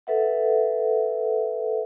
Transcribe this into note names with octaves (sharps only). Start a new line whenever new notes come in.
A4 B4 E5 F#5